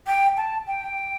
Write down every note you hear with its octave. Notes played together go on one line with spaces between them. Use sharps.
G5
A5
G5